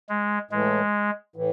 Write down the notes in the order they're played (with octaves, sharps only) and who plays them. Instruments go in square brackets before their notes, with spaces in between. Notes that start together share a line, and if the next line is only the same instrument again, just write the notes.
[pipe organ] G#3
[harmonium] A2 E3 A3 [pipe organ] G#3
[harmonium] A2 E3